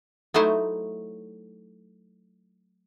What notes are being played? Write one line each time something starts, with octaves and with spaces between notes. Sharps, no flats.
F#3 A3 D#4 E4 C5 C#5